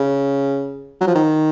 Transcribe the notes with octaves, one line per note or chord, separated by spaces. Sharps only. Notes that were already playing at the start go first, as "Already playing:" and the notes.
Already playing: C#3
F#3
F3
D#3